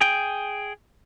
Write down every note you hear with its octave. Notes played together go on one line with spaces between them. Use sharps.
G#4 G5